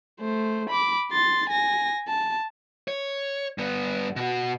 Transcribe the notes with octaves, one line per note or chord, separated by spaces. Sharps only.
A3 C5
B5 D6
C6 A6
G#5 A#6
A5
C#5
G2 B3
B2 F#4